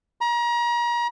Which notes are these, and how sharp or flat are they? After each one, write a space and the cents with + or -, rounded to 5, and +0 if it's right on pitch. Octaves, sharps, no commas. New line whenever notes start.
A#5 +35